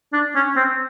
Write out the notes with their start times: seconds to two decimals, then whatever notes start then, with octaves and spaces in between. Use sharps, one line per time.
0.13 D4
0.35 C#4
0.56 C4